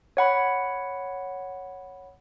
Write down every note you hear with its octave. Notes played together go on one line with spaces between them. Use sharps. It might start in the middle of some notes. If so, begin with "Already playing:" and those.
C#5 F#5 B5